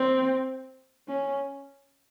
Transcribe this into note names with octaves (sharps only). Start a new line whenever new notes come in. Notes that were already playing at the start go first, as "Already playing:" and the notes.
Already playing: C4
C#4